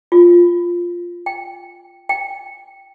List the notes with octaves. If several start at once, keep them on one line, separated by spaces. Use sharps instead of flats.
F4
G5
G5